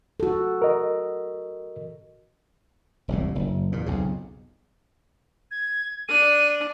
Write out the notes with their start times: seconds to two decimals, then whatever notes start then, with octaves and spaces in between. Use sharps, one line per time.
0.20 F#4 A4
0.62 A#4 D#5
3.08 E1 C2 A2
3.35 F#1 F#2
3.72 E2 A#2
3.86 B1 F2 C#3
5.51 G#6
6.08 D4 D#7